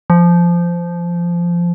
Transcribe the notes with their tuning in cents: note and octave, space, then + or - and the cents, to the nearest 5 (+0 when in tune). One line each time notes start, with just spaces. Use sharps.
F3 -15